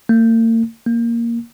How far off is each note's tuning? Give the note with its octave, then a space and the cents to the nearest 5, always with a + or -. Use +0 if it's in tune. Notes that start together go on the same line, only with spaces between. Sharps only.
A#3 -45
A#3 +0